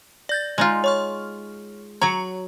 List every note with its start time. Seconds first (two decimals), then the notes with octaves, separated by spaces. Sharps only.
0.29 D5 G6 A6
0.58 G#3 D#4 F4
0.84 C#5 C#6 F6
2.01 F#3 C#5 A#5